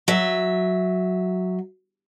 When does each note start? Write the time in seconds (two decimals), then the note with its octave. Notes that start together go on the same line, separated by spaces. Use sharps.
0.08 F#3 E5